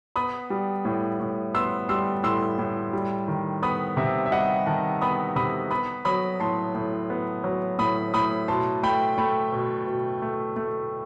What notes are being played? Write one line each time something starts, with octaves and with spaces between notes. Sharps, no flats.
B3 B5 D#6
G3
A2
A2
B3 C6 E6
G3 C6 E6
A2 C6 E6
A2
G3
D#3
B3 B5 D#6
C3 E5
E5
G3 D#5 F#5
D#3 F#5 A5
B3 B5 D#6
C3 B5 D#6
B3 B5 D#6
F#3 B5 D#6
A2 A5 C6
A2
B3
F#3
A2 B5 D#6
A2 B5 D#6
B2 A5 C6
A3 G5 B5
A3 G5 B5
B2
B2
A3
A3